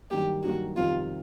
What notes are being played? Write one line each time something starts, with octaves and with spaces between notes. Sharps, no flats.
G2 D#3 F#3 A#3 G4
G2 D#3 F#3 A#3 F#4
F2 C3 D#3 G3 C4 F4